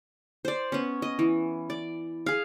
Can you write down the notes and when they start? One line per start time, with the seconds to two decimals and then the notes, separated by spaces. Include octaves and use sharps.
0.45 C5 D5
0.72 B3 C#4
1.02 D#5
1.19 E3
1.70 D5
2.26 G#4 F5